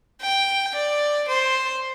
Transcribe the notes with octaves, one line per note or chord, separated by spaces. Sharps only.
G5
D5
C5